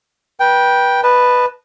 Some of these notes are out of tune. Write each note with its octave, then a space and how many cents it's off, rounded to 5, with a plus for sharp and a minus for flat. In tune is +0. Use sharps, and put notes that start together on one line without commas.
B4 -30 G5 +0
B4 +0 D#5 -25 A5 +0